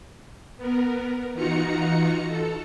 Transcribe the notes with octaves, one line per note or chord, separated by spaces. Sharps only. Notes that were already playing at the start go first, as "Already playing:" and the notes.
B3 A#4
E3 D#4 F4 F#4 A#5 C#7
A4